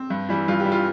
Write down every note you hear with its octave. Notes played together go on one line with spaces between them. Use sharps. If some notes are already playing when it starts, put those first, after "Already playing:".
Already playing: C4
G2
E3 G3
G2 F4
G4
E3 G3
F4